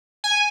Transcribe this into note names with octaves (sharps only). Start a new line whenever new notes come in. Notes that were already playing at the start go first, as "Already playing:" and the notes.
G#5